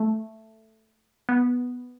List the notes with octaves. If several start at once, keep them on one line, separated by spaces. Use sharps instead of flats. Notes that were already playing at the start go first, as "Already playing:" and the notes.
Already playing: A3
B3